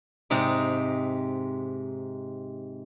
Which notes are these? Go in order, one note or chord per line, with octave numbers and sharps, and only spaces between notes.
G#2 C3 G#3 D#4 G4